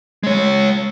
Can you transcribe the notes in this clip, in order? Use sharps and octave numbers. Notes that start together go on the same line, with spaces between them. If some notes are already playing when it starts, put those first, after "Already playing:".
G#3 C#5